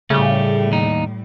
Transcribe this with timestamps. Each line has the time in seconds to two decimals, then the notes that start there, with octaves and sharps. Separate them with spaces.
0.10 A2 C#3 G3 A3 G4
0.72 D#2 D#4